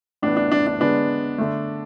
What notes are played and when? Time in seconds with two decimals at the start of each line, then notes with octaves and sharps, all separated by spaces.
0.22 A2 E3 B3 D4
0.37 D4
0.52 D4
0.67 D4
0.80 D3 G#3 B3 D4
1.38 D3 A3